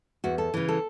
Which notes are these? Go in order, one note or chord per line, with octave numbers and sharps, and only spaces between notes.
E2 F#4
A4
C#3 E3
A4